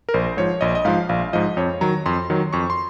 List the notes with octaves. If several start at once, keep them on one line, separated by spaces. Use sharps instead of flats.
A#4
A#1 C5
G#2 F3 C#5
A#1 D#5
D#5
G#2 F3 F5
A#1 F5
G#2 F3 D#5
F2 C#5
D#3 F#3 A#5
F2 C6
D#3 F#3
F2 C#6
C6